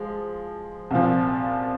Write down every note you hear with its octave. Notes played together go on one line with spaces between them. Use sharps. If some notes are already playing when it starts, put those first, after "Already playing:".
Already playing: F3 G#3
C2 A#2 F3